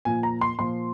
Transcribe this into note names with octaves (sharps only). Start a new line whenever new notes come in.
A#2 F3 G#5
A#5
C6
A#2 F3 C6